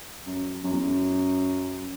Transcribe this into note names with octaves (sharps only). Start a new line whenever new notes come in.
F#2
F#2
E2
F#2